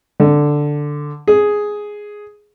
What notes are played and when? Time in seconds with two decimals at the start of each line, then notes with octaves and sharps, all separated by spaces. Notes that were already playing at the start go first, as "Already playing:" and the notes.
0.20 D3
1.28 G#4